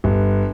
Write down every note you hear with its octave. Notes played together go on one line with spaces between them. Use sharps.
G1